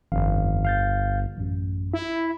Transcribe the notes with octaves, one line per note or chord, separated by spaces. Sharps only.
G1 F2 D#3 F5
F5 G6 A6
A1 F#2
E4 E5